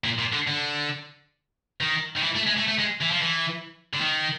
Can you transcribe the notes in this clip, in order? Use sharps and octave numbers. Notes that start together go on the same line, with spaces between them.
A#2
A#2
D3
D3
D#3
D#3
E3
A3
G#3
A3
A3
G#3
E3
F3
E3
D3
D#3